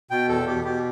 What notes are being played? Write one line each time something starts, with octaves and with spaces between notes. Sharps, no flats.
B2 G5
E2 A4
B2 G4
B2 G4